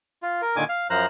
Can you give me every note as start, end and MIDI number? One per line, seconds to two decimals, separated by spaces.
0.22 0.42 65
0.42 0.56 70
0.56 0.64 46
0.56 0.64 50
0.56 0.64 51
0.56 0.64 80
0.56 0.64 86
0.69 0.87 77
0.90 1.06 42
0.90 1.06 53
0.90 1.06 72
0.90 1.06 82
0.90 1.06 89
0.90 1.06 90